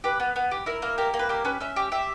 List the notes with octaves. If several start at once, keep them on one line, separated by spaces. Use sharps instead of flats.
G4 B4
B3
B3
G4
E4 A#4
A#3 A#4
G4 A#4
A#3
B4
G4 A#4
C#4 B4
C#4 E5
G4
G4 E5